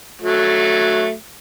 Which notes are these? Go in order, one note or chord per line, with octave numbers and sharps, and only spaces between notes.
F#3 A3